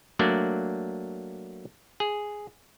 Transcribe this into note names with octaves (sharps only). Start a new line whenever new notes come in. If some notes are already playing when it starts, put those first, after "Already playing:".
F#3 A3 A#3 D4 D5
G#4